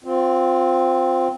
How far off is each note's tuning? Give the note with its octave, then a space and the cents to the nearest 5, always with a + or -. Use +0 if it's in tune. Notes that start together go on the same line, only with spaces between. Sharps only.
C4 +0 F4 +20